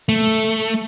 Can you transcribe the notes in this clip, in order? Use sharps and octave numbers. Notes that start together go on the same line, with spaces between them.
A3